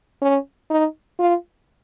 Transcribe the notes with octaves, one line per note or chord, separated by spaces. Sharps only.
C#4
D#4
F4